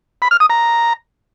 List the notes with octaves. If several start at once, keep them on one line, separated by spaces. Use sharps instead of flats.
B5
F6
D#6
A#5